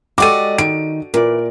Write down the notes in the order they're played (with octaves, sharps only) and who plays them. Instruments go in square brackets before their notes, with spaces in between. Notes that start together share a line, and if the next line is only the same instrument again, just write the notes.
[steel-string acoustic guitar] G#3 D5 D#5 [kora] F#4 G4 A4 [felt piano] D6 D#7
[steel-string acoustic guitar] D#3 [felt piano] D7
[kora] A#2 D5 [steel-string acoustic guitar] E3 [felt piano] A#4